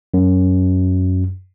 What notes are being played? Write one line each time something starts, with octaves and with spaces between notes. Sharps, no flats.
F#2